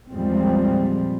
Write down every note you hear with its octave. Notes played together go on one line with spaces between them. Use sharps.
E2 A#2 F3 G3 G#3 C4